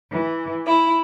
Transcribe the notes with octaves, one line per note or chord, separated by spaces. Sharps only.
E3
E4